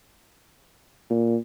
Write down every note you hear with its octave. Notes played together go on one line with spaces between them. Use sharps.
A#2